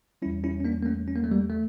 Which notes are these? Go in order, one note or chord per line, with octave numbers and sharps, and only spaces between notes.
E2 E3 G3 C#4 E4
C#4 E4
C#4
A#3 D4
A#3
A3 C#4
C#4
A#3
A3
G3 A#3
A3